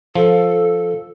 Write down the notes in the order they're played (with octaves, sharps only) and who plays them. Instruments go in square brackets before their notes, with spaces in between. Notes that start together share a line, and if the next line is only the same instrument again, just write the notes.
[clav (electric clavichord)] F3 [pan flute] A4